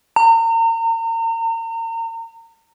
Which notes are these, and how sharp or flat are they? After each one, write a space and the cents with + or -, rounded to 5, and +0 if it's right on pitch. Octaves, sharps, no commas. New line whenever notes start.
A#5 -35